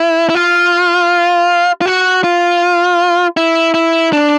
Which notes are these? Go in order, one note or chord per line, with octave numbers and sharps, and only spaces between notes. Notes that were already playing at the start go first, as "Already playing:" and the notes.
Already playing: E4
E4
F4
F4
F#4
F4
E4
E4
D4